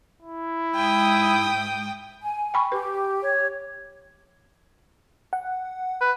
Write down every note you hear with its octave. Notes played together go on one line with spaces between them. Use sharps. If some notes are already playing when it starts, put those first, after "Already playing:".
E4
G#2 G5 D#6
G#5
G5 B5 C#6
G4 B4
C#5
F#5
B4